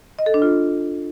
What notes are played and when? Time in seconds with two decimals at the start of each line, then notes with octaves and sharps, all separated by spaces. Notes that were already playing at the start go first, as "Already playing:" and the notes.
0.19 D#5
0.26 A4
0.34 D4
0.42 F4